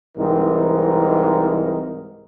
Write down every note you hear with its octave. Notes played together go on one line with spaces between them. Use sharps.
C2 G#2 E3 C4 D#4 A#4